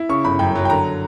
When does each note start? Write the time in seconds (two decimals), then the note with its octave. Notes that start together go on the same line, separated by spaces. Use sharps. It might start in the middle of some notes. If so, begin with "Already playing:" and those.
Already playing: E4
0.09 C#3 C#6
0.25 G1 B5
0.39 F#2 G5
0.55 F#3
0.65 G5
0.70 D3 A#5